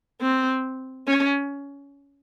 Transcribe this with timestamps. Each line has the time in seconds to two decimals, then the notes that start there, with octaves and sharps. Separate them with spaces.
0.22 C4
1.07 C#4